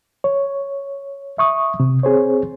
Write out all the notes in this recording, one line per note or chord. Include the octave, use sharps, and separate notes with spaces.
C#5
E5 C#6 D#6
C3
C4 G#4 C5 C#5